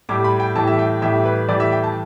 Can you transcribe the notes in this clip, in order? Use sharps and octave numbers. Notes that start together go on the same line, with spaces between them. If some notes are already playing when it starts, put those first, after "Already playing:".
A2 G3 D6
B5
G5
A2 E3 G3 A5
E5
G5
A2 E3 G3 E5
B4
A2 E3 G3 D5
E5
G5
A5